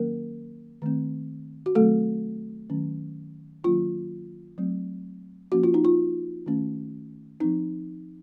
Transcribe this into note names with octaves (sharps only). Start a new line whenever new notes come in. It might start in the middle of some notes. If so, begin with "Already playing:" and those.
Already playing: D#3 F#3 A#3 C#4 A#4
D#3 A3 C4
F#4
D#3 F#3 A3 C4 A4
D#3 F#3 A3 C#4
D#3 F#3 A#3 C#4 F4
F#3 A3 C4
F3 A#3 C#4 F#4
F4
D#4
F4
D#3 A3 C#4
F3 C4 D#4